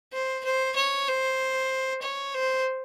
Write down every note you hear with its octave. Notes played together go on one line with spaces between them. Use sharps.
C5
C5
C#5
C5
C#5
C5